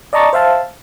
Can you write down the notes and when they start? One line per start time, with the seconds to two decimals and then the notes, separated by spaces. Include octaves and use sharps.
0.13 D5 D#5 A5 A#5 C#6 A6
0.33 C5 E5 F5 A5